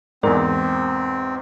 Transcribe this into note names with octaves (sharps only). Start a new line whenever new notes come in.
E2 G#2 C4 A#4 D5